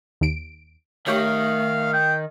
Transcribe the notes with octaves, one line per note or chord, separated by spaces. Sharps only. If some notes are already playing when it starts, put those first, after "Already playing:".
D#2 D7
D#3 A3 G4 C#5 F5
G5